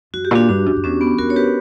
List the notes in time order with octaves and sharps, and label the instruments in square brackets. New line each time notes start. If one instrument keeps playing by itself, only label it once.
[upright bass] F#2 [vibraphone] F#4
[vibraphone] G4
[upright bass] A#2 [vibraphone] D4 F#4
[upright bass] G2 [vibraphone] D4
[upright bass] F#2
F#2
[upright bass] E2 [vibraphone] C#4
[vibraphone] B3
[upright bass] E2 [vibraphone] F#4 A#4
[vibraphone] C#5
G4 B4